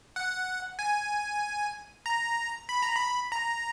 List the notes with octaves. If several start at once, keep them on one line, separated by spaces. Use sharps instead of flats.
F#5
G#5
A#5
B5
A#5
B5
A#5